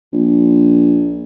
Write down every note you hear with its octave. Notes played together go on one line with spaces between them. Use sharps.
A#1